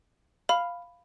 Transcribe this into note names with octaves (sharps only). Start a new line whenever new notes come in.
F5 B5